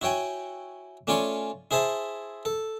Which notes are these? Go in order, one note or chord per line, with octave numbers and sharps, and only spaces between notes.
E4 F#4 C#5 G5 G#5
A3 C#4 F4 D5 G#5 C#6
E4 G#4 C5 E5 A5
A4